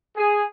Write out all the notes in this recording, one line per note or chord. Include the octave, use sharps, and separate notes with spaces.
G#4